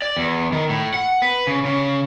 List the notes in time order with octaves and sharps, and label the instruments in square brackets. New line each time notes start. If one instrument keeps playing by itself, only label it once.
[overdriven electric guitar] D5
E2
D#3
A2
F#5
B4
C#3
C#3